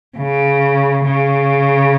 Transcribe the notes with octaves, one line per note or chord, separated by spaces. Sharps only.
C#3
C#3